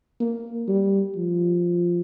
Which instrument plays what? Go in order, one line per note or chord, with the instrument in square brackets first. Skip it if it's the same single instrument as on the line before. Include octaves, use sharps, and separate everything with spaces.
[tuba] A#3
G3
F3